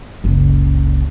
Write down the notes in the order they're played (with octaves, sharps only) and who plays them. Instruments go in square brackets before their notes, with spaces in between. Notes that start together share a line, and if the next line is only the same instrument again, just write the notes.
[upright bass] F#1 C#2